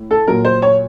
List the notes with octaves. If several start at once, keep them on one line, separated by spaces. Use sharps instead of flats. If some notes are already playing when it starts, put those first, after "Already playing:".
Already playing: A2
A4
A#2 F#3 A#4
C5
C#5